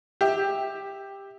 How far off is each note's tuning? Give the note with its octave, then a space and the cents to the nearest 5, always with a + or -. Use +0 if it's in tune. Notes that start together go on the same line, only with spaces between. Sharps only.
G4 +10 E5 -15